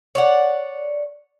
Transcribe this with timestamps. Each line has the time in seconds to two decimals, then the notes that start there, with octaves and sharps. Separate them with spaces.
0.15 C#5 D5 F#5